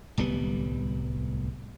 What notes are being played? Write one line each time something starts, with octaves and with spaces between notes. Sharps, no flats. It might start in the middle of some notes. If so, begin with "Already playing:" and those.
D1 C2 G3 B3